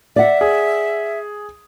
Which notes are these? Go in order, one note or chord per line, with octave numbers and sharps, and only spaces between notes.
D5 E5 F#5
G#4